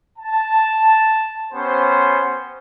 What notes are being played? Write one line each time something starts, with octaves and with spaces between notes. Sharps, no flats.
A5
B3 C#4 G4 C5